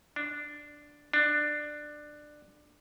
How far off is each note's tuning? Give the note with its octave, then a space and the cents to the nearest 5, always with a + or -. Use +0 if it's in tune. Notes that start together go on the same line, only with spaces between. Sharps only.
D4 +0
D4 +15